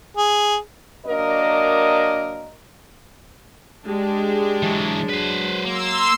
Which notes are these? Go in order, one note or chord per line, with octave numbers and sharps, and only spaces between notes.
G#4
F#3 A#3 D4 A#4 D#5
G#3 D4 G4
E3 F#3
F#3 B4 C5
A#3 C6 E6